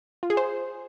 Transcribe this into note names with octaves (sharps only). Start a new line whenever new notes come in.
F4
G#4
C5